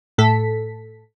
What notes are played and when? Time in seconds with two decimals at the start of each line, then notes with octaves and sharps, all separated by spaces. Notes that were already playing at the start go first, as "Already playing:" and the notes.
0.18 A2 A4 B6